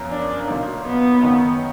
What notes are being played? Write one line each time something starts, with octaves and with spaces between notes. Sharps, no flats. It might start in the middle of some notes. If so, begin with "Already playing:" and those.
Already playing: F#2 F3 B3 F4 A#4
D4
A#2 F#3 A#3 D#4
B3
F#2 D#3 A#3 D#4